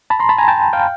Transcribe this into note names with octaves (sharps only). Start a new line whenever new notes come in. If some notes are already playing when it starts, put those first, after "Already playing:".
A5 B5
A#5 C6
A5 B5
G#5 A#5
G5 A5
F5 G5